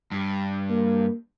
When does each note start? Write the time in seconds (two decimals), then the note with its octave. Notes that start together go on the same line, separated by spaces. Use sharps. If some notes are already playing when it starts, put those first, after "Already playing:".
0.11 G2
0.70 A#3